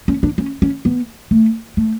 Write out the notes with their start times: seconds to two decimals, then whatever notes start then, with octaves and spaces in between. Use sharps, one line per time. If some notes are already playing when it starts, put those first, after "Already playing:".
0.08 C#4
0.23 D4
0.38 C#4
0.62 C#4
0.85 B3
1.31 A3
1.77 A3